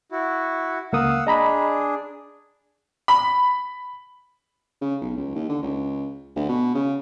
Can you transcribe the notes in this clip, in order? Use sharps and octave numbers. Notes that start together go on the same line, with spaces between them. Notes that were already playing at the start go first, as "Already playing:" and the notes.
E4 F#4
C#2 A#3 F5 F#5 D#6 E6
D4 G#4 D#5 A#5 B5
B5
C#3
B1
C#2
D#2
D3
C#2
D2
B2
C#3